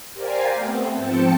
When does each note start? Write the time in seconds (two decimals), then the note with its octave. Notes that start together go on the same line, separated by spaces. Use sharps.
0.14 G4 A#4 C5 D5 F5 G#5
0.54 A3 B3 C4
0.95 G#2 F3 C4 G5 A5 C#7